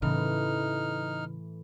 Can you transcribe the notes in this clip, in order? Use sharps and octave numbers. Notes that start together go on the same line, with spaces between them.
A2 C#3 E3 D#4 F6